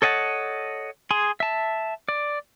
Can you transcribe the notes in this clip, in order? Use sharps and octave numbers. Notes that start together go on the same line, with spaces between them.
A4 C#5 D#5 F#5 A5
G#4 G#5 C6
E5 A5
D5